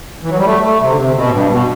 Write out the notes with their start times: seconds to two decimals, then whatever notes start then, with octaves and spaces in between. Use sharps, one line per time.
0.22 E3
0.30 F#3
0.38 G3
0.45 A3
0.62 A3
0.80 C3
0.90 D3
0.97 C3
1.15 B2
1.27 A2
1.32 G2
1.50 B2